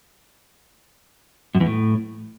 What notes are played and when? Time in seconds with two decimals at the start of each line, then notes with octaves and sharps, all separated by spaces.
1.55 F#2
1.60 E2
1.66 A2